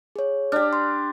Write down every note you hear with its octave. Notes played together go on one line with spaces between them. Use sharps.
G#4 C#5
D4 G4 F6
C6